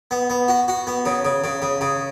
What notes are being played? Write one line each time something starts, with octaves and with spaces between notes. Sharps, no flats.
B3
B3
F#4
F#4
B3
C#3
C#3
C#3
C#3
C#3